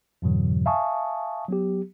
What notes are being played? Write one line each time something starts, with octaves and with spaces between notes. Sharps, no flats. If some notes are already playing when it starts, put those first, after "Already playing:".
F2 G#2 B2 D3 E3 F#3
E5 F5 G#5 A5 C#6 D#6
F#3 B3 G4